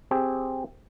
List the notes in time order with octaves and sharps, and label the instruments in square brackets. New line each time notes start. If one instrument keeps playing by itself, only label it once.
[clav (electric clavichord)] C4 G4 G#4